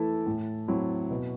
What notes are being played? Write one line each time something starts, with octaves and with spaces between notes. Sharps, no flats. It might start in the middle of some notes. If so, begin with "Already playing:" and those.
Already playing: E3 A3 E4 A5
A2
F#3 C4 E4
B2